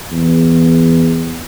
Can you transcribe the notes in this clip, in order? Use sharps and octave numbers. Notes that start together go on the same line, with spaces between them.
E2